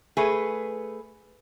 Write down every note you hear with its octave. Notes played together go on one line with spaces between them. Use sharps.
A3 G#4 B4